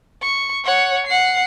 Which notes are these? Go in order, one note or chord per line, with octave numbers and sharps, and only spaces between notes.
C#6
C#5 F#5
F#5 C7